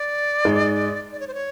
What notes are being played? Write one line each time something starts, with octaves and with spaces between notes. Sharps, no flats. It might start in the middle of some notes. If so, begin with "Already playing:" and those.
Already playing: D5
G#2 G#3
D5
C#5
C5
C#5